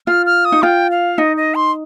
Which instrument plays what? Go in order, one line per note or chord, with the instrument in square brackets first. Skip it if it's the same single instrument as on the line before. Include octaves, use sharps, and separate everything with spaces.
[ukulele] F4 [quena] F6
[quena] F6
D#6
[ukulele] D#4
[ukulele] F4 [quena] G5
[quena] F5
[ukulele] D#4 [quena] D#5
[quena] D#5
C6